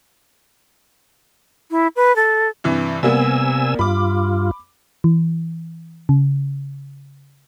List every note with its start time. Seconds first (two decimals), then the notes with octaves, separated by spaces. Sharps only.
1.71 E4
1.96 B4
2.16 A4
2.64 G2 C3 E3
3.03 C3 G3 A#3 B3 G#5 E6
3.79 G2 F4 B5 D6
5.04 E3
6.09 C#3